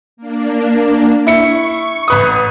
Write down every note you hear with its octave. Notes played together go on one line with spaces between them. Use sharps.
A#3 D4
E4 C#6 C#7
A1 B4 D#6